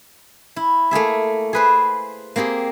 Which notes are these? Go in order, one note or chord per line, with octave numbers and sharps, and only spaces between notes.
E4
A3 A#3 G#4 E5
G#4 B4 C5
A#3 C4 G4 G#4